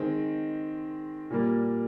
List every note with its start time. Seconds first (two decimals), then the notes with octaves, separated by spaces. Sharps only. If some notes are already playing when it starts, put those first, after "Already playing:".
Already playing: D#3 G#3 C4
1.30 A#2 G3 A#3